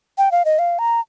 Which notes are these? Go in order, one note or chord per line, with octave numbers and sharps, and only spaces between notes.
G5
F5
D#5
F5
A#5